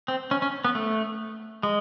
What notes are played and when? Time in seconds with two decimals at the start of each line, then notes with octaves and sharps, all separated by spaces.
0.08 C4
0.31 C#4
0.42 C#4
0.65 B3
0.75 A3
1.63 G#3